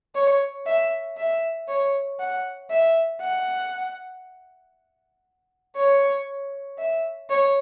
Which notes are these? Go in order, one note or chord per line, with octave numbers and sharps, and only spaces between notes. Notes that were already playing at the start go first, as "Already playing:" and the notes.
C#5
E5
E5
C#5
F#5
E5
F#5
C#5
E5
C#5